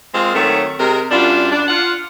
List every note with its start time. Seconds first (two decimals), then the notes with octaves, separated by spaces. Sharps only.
0.14 G#3 A#3 C4 F4
0.34 D#3 F#3 A3 C4 C#5
0.80 C3 G#3 A#4
1.11 F#2 G3 D4 F4
1.52 D4
1.68 F4 F#5